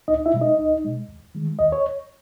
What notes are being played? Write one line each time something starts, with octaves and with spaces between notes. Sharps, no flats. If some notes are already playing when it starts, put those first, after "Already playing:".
C#2 D#4 D#5
E4 E5
B2 G#3
D#4 D#5
C#2
B2 G#3
D#2
D#3 G#3
D#2 D#5
C#5